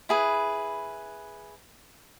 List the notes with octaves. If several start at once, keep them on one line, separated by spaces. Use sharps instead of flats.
E4 G#4 B4